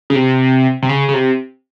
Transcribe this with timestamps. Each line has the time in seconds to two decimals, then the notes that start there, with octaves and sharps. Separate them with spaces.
0.10 C#3
0.15 C3
0.82 C3
0.89 C#3
1.08 C#3
1.14 C3